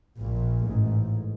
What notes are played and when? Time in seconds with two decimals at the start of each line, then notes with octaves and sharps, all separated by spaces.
0.19 A#1 A#2
0.66 A1 G#2